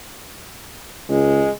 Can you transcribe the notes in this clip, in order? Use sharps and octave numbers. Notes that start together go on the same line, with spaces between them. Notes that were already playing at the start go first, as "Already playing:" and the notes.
C#2 G#3